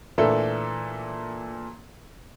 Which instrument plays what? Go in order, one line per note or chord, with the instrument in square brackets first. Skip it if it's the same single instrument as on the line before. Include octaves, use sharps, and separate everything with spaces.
[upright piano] A#2 E3 A3 A#3 D4 A4